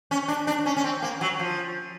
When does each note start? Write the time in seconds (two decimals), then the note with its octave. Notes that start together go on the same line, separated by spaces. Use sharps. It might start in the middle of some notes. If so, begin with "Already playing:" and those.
0.11 C#4
0.28 D4
0.47 D4
0.66 C#4
0.77 C#4
0.84 C4
1.02 A#3
1.21 F#3
1.39 F3